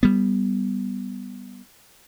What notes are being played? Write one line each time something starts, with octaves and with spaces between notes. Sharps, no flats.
G3 B3